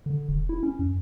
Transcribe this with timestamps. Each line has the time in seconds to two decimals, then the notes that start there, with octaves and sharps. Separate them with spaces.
0.06 D3
0.29 E1
0.49 E4
0.63 C#4
0.79 F#2